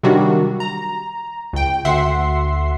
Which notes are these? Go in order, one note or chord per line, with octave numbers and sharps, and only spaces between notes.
C3 D#3 F#3 G3 D4 F#4
A#5
C#2 G5
D2 E5 F#5 C6 C7